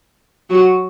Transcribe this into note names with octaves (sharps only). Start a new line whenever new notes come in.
F#3 F#4